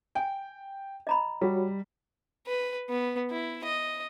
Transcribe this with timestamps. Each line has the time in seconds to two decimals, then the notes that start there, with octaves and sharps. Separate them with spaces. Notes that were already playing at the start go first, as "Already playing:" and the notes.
0.15 G5 G#5
1.07 D#5 A#5 B5
1.41 G3 F#4 G4 C#5
2.47 B4
2.90 B3
3.31 E4
3.65 D#5